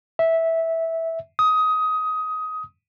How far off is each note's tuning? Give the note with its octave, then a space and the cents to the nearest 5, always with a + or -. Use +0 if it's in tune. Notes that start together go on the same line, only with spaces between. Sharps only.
E5 -10
D#6 +15